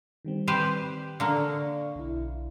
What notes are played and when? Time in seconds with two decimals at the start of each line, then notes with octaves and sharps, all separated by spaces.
0.25 D#3 G3 C4
0.48 G4 B4 C5
1.20 D3 A#3 F5 C#6
1.95 B1 E4